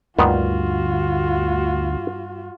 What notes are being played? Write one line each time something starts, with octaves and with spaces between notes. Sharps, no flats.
D2 G2 A#2 D#3 B3 F4 F#4